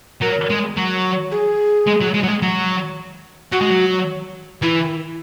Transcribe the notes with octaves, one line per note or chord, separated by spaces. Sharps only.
F#3 A#4
G#3
F#3
G#4
G#3
F#3
G#3
F#3
G#3
F#3
F#3 F#4
G#3
F#3
E3 E4